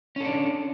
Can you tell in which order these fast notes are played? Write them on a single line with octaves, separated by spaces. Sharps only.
C#4 A4 D4